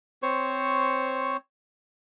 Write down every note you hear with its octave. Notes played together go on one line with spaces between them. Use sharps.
C4 C5 C#5 C#6